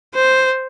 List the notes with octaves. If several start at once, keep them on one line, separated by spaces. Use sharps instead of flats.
C5